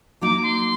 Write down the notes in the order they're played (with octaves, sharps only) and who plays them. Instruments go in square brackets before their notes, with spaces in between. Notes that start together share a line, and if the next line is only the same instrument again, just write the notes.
[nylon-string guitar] F#3 A#3 D#4 [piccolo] D6
[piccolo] C6